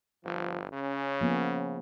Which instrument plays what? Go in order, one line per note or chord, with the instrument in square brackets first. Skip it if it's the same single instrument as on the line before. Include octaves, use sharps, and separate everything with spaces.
[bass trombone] G1 [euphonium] F3
[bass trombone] C#3 [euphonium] C#4
[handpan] F3 A#3 B3